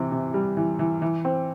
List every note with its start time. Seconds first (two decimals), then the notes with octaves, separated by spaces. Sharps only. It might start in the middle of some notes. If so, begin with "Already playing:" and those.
Already playing: C3 E3
0.12 C3
0.34 G3
0.57 E3
0.79 E3
1.02 E3
1.25 C4